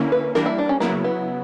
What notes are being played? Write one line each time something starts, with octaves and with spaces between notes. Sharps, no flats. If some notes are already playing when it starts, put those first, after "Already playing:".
Already playing: D3 A#3 C#4 E4
B4
E3 G3 A#3 D4 A#4
E4
D4
C#4
C#3 F#3 A#3 B3 E4
B3